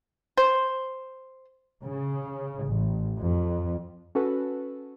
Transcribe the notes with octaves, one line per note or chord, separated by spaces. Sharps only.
C5
C#3
A1
F2
C#4 F#4 A4 B4